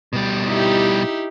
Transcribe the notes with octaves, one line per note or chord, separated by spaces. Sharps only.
B2 G3
D#4 E4 G4